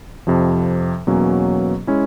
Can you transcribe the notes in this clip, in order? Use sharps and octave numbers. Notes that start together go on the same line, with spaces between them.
F2 C3 F3
E2 B2 F#3 A#3 C#4
G#3 C#4 E4